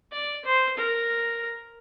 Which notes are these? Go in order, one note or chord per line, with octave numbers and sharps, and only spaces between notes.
D5
C5
A#4